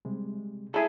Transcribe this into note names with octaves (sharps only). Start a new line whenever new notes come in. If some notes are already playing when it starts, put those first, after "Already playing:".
C3 G3 G#3
E4 G#4 A4